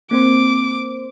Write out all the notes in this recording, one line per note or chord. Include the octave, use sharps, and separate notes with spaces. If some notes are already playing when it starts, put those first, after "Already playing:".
A#3 C4 C5 D6